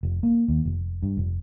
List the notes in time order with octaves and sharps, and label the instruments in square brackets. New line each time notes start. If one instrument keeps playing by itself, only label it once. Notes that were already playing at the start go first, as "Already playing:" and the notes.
[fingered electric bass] F1
A#3
D#2
F1
G2
F1